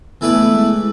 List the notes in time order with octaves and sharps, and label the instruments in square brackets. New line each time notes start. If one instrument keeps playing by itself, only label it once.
[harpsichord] E3 A3 E4 B4 D5 [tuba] B3
[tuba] G#3